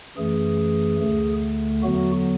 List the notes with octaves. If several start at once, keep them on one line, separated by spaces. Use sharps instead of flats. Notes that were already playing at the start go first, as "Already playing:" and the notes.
F#2 E3 A3 G#4
D2 D3 A3
E2 D3 F#3 B3 F#4